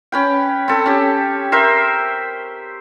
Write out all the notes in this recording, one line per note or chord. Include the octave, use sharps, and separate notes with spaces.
C#4 B4 G5
C4 A4
C#4 G4
A#4 C5 E5